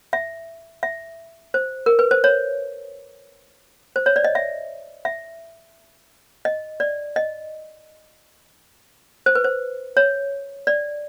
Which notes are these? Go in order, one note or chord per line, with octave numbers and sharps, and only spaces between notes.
E5
E5
C5
A#4
B4
C5
C#5
C5
C#5
D5
D#5
E5
E5
D#5
D5
D#5
C5
B4
C5
C#5
D5